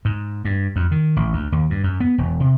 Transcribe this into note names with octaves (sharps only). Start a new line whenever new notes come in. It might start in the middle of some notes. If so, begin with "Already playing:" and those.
G#2
G2
F2
D#3
A1
D2
D#2
G2
F#2
B3
E1
C3